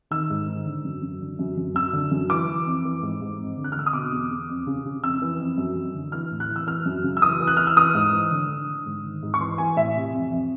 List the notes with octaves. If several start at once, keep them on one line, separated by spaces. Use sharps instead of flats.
D#3 E6
G#2
D#3
D3
F#2
F#2
D3
F#2
F#2
F#2 E6
D3
F#2
E3 D6
E3
F2
E3
G#2
G#2
F2
D3
F#6
F6
D3 E6
D#6
B2 D6
E2
E2
F2
C#3
C#3
F2 E6
E3
F2
F#2
F#2
D3
E3 F6
A2
F#6
E3
E6
E3 F6
F#2
C#3
E6
E3 D#6
E3
F#6
E3 F6
E6
E3 D#6
G#2
E3
D3
D3
D3
G#2
D#3
G#2
C#6
E3 C6
E3 G#5
A2 E5
C3
F2
F2